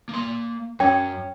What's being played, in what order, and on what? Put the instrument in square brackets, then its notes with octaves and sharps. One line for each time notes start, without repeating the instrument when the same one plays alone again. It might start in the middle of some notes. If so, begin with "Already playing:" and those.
[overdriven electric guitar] A#3 C6
[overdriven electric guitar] F#2 [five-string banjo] C#4 [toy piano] G5